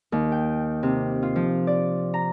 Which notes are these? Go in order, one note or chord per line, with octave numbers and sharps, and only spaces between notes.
D#2
G5
C3
F4
F3
D5
A#5